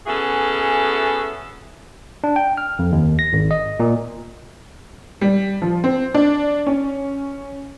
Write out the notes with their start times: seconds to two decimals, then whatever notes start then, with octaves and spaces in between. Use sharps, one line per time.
0.07 B3 C#4 E4 F#4 G#4 A4
2.24 D4
2.36 G5
2.57 F6
2.79 F2
2.92 D#2
3.19 A#6
3.33 G#1
3.51 D#5
3.80 A#2
5.21 G3
5.62 F3
5.84 C4
6.14 D4
6.67 C#4